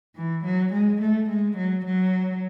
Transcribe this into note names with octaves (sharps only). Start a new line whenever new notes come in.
E3
F#3
G#3
A3
G#3
F#3
F#3